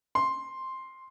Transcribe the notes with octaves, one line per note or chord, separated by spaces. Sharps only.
C6